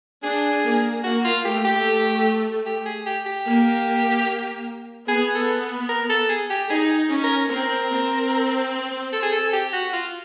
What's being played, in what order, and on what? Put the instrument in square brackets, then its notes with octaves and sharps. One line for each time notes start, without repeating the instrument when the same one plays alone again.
[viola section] D4 [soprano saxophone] G#4
[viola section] A#3
[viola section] A#3 [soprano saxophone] F#4
[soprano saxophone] F4
[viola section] A3 [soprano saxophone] G4
[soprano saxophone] G4
G4
G#4
G4
G4
[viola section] A#3
[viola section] B3 [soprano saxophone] G#4
[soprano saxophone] A4
A#4
A4
G#4
G4
[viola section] D#4 [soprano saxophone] G#4
[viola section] C#4
[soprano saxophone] A#4
[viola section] C4 [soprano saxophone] A#4
[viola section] C4
[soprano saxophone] A4
G#4
A4
G4
F#4
F4